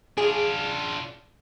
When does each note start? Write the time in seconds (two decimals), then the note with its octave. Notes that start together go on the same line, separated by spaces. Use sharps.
0.18 D4 F4 G#4